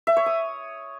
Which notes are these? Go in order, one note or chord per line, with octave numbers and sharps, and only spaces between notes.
E5
C#5
D#6